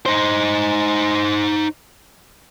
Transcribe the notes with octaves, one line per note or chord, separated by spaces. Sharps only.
D#4 C5